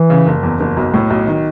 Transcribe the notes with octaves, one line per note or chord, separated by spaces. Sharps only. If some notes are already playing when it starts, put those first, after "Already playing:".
Already playing: E3
C#3
F#1
E2
F#1
B1
A2
B1
D#3